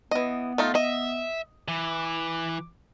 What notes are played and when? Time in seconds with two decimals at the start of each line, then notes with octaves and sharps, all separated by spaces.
0.11 E3 B3 D#5
0.58 A3 D#4 F4
0.75 D#5 E5
1.68 E3 D6